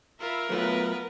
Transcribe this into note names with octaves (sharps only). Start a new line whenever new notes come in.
F4 A#4 E5 B5
F#3 A3 B3 F4 A4 B4